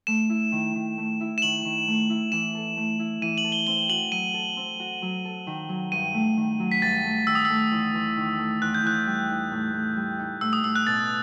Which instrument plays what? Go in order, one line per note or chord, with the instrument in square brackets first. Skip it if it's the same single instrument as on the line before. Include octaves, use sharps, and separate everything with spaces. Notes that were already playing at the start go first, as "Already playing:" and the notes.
[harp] A3 [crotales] E7
[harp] E4
D#3
D#3
A3
E4
[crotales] E7
[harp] D#3 [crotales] F#7
[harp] D#3
A3
E4
[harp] E3 [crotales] E7
[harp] A4
A3
E4
[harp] E3 [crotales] D#7
[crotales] F#7
[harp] A4
[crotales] G7
[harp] C4 [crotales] G7
[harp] F#4 [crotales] F#7
[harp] F#3 [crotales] D#7
[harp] A4
C4
F#4
F#3
A4
D#3
F#3
[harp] G2 [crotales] D#7
[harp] A3
D#3
F#3
[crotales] B6
[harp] G2 [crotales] A6
[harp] A3
[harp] D#3 [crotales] E6
[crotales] D#6
E6
[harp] A3
E2
E2
D#3
A3
[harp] E2 [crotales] F#6
[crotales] G6
[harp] E2 [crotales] F#6
[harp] G3
D#4
A2
A2
G3
D#4
[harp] A2 [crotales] E6
[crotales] D#6
[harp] A2 [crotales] E6
[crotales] F#6
[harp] B2 [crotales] A6